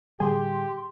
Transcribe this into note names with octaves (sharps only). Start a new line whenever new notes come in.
A2 D3 G3 G4 G#4 C6